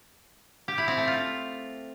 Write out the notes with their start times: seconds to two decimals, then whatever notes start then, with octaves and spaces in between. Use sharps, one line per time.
0.68 G4
0.78 E4
0.88 C4
0.98 A3
1.07 F4